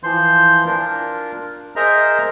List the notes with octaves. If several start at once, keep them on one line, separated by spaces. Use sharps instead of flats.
E3 F3 C5 C6 G6
D4 F4 A#4
G#4 A#4 C5 D#5 E5 A#5